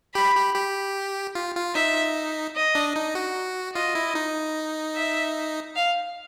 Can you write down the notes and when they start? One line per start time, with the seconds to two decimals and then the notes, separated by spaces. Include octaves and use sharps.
0.15 G4 B5
0.36 G4
0.55 G4
1.35 F4
1.55 F4
1.75 D#4 E5
2.56 D#5
2.75 D4
2.96 D#4
3.15 F#4
3.75 F4 D#5
3.95 E4
4.15 D#4
4.96 E5
5.76 F5